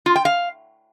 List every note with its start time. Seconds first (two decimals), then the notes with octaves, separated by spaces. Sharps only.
0.06 F4
0.16 G5
0.25 F5